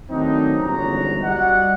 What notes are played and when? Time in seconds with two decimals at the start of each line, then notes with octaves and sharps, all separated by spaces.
0.10 D#3 F#3 A3 C4 D4 D#4
0.61 G1 E2 G#2 C#4 F#4 A#5
1.23 G3 F#4 D5 D#5 F#5